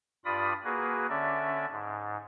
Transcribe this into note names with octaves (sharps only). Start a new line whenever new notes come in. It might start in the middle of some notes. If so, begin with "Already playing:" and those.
G2 F4 D5 B5 D#6
A#3 F#4 G#4 B4
D3 C#4 D5 E5
G#2